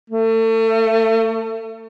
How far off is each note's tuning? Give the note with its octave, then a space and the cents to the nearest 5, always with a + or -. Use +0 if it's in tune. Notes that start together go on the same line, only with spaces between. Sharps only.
A3 +35